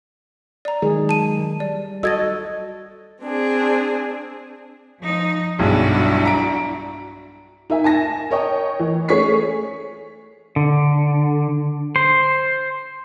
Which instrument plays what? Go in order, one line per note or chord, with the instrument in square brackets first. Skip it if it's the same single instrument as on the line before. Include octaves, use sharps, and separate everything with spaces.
[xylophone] D5 A#5
[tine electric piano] D#3 F#3 G#3 [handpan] G#4
[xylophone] A5 D#7
[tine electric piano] G3 [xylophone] D5
[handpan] F#4 A4 D#5 [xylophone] E6 G#6 A6
[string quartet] C4 D4 G#4
[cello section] F3 D#4
[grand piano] B1 G2 G#3 [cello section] D4 E4 F#4
[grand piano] A#5 D7
[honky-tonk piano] D#4 A#4 E5 G#5
G#5 A5 A#6
A#4 C#5 D#5 G5
E3
A3 C#4 G#4 C#6 B6 C7
[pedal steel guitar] D3
C5